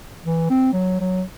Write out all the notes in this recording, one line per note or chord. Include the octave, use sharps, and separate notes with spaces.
E3
C4
F#3
F#3